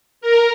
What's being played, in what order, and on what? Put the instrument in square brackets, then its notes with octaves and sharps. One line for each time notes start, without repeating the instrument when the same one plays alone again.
[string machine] A#4